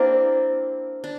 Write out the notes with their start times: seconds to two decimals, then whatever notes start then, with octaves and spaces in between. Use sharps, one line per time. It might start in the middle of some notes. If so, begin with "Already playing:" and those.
Already playing: A#3 C4 D4 E4 G4
1.04 D4